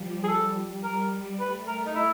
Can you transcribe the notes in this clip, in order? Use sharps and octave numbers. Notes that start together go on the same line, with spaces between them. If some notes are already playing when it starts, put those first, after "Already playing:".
Already playing: F3 G3
G#4
G3 A4
G3 A#4
A3 B4
A#4
D#4
E4